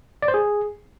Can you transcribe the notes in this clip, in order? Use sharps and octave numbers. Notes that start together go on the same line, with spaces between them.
D5
C5
G#4